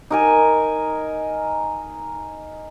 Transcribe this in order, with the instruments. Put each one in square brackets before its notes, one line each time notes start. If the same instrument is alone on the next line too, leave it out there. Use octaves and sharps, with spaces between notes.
[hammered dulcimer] D#4 A#4 G#5